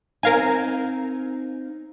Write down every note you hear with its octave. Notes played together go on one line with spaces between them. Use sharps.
C4 D#4 A#4 F5 G#5